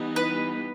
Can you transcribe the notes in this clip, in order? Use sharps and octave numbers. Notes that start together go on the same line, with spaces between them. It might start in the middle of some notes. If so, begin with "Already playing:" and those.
Already playing: E3 G3 B3 D#4
B4